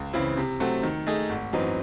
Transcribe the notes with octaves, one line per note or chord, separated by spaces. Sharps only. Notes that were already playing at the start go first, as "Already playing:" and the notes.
Already playing: C#2
C#3 E3 C4 E4
C3
F#3 A3 C4 F#4
D#3
A3 D#4 G#4
G#1
F#2 E3 C4 D#4